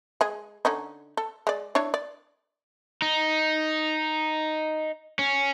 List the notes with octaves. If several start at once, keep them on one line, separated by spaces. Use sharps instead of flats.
G#3 G#4
D3 C#4 D#4
A4
G#3 D5
D4 E4 C#5
D5
D#4
C#4